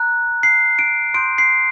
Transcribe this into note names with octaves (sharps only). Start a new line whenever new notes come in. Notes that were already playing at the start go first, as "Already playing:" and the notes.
Already playing: A#5 F#6
C7
D7
C6 D#6 G6 D7
C7